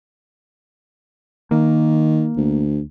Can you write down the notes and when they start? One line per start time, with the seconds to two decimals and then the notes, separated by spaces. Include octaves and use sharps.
1.51 D#3 A#3
2.37 D2